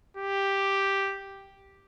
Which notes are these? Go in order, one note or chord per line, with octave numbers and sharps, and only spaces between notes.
G4